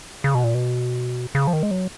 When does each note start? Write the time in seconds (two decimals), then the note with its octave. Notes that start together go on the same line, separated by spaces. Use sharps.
0.24 C#3
0.35 B2
0.44 A#2
0.55 B2
1.35 C#3
1.47 F3
1.53 D#3
1.63 G#3
1.71 F#3